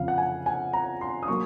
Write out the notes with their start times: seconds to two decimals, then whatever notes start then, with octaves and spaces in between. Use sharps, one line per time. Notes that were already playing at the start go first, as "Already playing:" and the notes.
Already playing: F2 C#3 F3 F5
0.08 F#5
0.18 G#5
0.46 G#5
0.73 A#5
1.01 C6
1.23 D#6
1.28 F#3 A#3 C#6